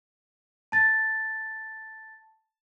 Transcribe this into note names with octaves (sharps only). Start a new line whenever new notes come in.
A5 A6